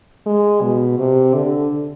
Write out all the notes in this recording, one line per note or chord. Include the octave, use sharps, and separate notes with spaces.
G#3
B2
C3
D3